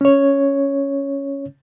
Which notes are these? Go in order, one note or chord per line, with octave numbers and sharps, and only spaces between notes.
C#4 C#5